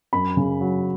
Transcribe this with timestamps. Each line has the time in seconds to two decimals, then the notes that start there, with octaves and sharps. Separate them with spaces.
0.13 F#2 B5
0.37 C#3
0.61 F#3